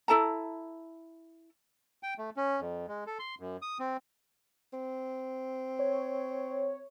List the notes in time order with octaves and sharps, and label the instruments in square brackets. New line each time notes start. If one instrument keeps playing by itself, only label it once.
[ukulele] E4 A4 A5 A#5
[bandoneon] G5
A3
C#4
F2
G#3
A4
C6
F#2
D#6
C4
[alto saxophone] C4
[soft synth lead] C#5